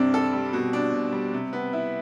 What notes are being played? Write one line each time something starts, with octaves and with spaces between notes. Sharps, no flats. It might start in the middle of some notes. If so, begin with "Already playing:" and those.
Already playing: G2 C3 C4 D4
A4
G3
B2
D4
B2
G3
C3
B3
E4